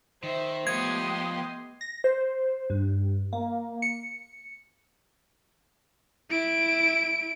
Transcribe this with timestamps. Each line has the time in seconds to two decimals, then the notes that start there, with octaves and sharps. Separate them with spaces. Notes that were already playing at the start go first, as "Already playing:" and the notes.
0.23 D#3 C5 E5
0.67 F3 A3 B3 G4 C#5 D#5 C6 G#6
1.81 A#6
2.04 C5
2.70 G2
3.33 A#3
3.82 C#7
6.31 E4 D7